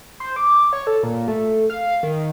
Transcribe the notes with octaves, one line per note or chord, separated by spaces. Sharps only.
C5
D6
C#5
A4
A#2
A3
F5
D#3